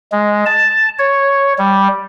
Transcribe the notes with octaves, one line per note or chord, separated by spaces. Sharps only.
G#3
A5
C#5
G3